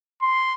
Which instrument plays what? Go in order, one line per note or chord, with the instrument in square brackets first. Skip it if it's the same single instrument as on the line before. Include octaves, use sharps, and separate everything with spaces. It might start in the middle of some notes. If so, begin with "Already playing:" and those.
[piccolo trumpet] C6